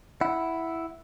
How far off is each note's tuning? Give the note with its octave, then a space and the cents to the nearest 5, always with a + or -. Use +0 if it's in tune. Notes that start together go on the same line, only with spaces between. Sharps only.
E4 +0 F#5 +0